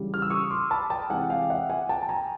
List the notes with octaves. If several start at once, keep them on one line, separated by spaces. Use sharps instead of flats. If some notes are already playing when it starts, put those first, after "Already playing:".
Already playing: C#3 E3 G3
F6
E6
C#6 D#6
C6 D6
A5 B5
G5 A5
C3 E3 G#3 F#5 G#5
F5 G5
E5 F#5
F#5 G#5
G5 A5
A5
G#5 A#5